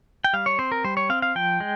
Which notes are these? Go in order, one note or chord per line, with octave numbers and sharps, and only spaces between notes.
G5
G3 F5
C#5
C4 C5
A#4
G3 C5
C#5
C4 F5
F5
F3 G5
G#3